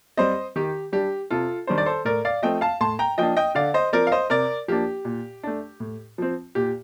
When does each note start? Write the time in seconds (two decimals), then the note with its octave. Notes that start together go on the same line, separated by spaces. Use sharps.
0.17 G3 C4 C5 D#5
0.56 D#3 G4
0.92 G3 D4 G4
1.30 C3 F4 A4
1.67 D#3 G3 D4 C5
1.78 D5
1.86 A4 C5
2.05 A2 A#4 D5
2.25 D5 F5
2.43 F3 A3 C4 D#5 G5
2.61 F5 A5
2.81 A2 A5 C6
2.99 G5 A#5
3.18 F3 A#3 D4 D#5 G5
3.37 D#5 G5
3.55 D3 D5 F5
3.74 C5 D#5
3.93 F3 C4 A#4 D5
4.07 F5
4.12 C5 D#5
4.30 C3 A#4 D5
4.68 F3 A#3 D4 G4
5.05 A#2
5.43 A3 D4
5.80 A2
6.18 F3 C4
6.55 A#2 G4